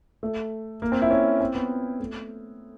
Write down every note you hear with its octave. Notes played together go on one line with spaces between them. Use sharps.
A3
A#3
C4
E4
C#4
C4
B3
A3